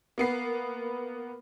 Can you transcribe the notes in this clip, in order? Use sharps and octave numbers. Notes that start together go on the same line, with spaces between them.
A#3 B3 C7